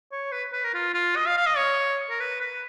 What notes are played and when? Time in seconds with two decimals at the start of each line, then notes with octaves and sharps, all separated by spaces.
0.12 C#5
0.32 B4
0.53 B4
0.64 A#4
0.74 F4
0.94 F4
1.16 D#5
1.27 F5
1.37 F5
1.47 D#5
1.57 C#5
2.10 A#4
2.20 B4
2.41 B4